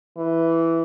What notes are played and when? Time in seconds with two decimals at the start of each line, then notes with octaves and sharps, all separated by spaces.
0.17 E3